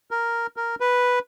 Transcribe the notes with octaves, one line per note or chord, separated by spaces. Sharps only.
A#4
A#4
B4